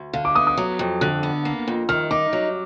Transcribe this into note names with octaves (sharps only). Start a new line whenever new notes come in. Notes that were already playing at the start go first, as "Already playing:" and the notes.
Already playing: D2
D3 F5
D6
B3 D#6
D#6
F#3
F2
D3 F#6
B3
A#3
F2
D#3 F6
D#4 D6
F#3